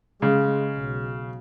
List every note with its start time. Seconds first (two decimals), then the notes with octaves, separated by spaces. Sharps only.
0.22 C#3 G#3
0.74 B1